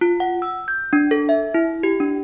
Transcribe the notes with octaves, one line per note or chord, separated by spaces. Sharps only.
F4
F#5
E6
G6
D4
A4
E5
E4
G4
D4